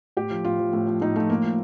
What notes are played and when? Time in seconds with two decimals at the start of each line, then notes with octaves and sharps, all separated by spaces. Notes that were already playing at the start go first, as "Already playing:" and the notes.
0.17 A2 G4
0.31 F3
0.44 A2 F4
0.59 F3
0.73 A2
0.87 F3
1.01 A2 D#4
1.16 F3 A3
1.30 A2 A#3
1.44 F3